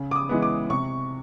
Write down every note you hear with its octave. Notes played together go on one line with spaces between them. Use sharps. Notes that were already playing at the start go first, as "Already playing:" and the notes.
Already playing: C#3
D6
D#6
E3 G#3 B3
D6
C3 C#6